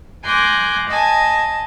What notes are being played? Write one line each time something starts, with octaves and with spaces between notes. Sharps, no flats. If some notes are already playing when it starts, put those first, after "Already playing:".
G#5 C6 D6 F#6 G6 A#6
D#5 G#5 A5